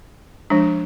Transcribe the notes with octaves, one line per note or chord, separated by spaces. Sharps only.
F3 G#3 D4